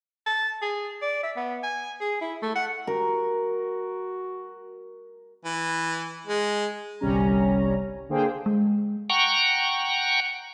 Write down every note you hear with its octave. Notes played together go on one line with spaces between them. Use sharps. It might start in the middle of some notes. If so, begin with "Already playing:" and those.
A5
G#4
D5
E5
B3
G#5
G#4
E4
A3
F#5
F#4 A#4
E3
G#3
G1 C2 C3 G3 C#4 A#5
D3 A#3 G#4 C5 G5
G#3
F#5 G5 A#5 C#6